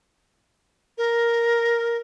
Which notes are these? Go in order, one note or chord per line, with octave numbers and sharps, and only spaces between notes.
A#4